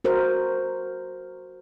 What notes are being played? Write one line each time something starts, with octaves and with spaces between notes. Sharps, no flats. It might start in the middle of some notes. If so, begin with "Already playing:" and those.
F#4 A#4 C5